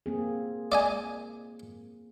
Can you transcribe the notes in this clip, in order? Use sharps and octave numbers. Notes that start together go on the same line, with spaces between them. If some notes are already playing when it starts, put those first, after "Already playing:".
A#3 C4 G#4
D5 D#5 G#5